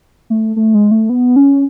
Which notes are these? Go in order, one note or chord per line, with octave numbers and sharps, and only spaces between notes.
A3
A3
G#3
A3
B3
C#4